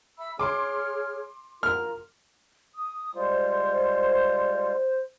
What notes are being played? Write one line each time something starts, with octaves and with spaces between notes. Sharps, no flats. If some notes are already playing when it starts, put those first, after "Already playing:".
E5 B5 E6
G#4 C#5 C6 D6 F6
F4 A#4 F6
D#6
G3 G#3 F4 C5